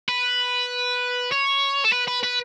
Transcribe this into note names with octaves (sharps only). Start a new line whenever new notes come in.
B4
C#5
A4
B4
B4
B4